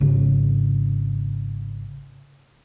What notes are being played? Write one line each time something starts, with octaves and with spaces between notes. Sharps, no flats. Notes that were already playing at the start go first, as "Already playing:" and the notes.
G#1 C#3